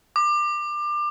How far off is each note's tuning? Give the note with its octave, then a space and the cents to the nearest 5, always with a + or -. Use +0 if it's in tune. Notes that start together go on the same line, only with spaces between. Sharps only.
D6 +25